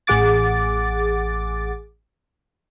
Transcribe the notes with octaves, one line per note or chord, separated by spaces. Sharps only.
A1 G#4 F#5 D6 A6